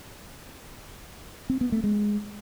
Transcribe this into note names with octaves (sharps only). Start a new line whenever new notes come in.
C4
B3
A3
G#3